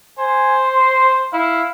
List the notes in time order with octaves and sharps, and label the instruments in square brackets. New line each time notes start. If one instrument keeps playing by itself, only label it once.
[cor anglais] C5 [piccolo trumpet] G#5
[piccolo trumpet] C6
[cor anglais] E4 [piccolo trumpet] F5